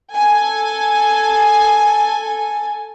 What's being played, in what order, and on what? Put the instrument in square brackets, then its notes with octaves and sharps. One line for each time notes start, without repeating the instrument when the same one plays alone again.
[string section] A4 G#5